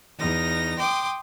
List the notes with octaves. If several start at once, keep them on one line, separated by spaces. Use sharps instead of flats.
E2 D#4 A#6
G5 C6 D6 D#6